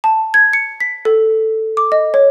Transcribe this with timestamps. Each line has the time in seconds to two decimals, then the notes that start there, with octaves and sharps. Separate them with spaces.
0.04 A5
0.34 G#6
0.53 C#7
0.80 B6
1.05 A4
1.77 D6
1.92 D#5
2.14 C#5